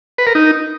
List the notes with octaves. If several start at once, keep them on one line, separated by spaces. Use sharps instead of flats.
B4
A#4
D#4